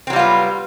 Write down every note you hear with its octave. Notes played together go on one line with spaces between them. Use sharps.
F#3 G3 B3 C4 F4